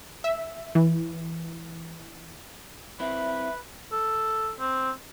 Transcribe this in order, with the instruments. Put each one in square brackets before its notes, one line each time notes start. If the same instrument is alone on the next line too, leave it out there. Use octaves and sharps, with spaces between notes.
[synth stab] E5
E3
[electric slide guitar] C4 E4 [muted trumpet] B4 [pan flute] E5
[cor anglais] A4
C4